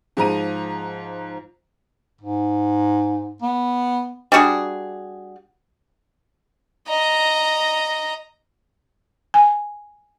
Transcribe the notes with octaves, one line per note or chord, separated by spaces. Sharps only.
G#2 F3 A#5 D#7
G#2
B3
G3 D4 F#4 G#4
D#5 A#5
G#5